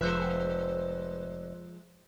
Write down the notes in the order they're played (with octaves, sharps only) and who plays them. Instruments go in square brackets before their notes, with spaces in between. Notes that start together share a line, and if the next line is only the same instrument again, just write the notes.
[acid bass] F1 [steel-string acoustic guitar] F3 [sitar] G#3 C5 E5 [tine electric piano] B4 F#6